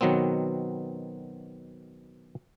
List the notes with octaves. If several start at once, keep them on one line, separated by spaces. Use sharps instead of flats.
B2 D#3 F#3 B3 C4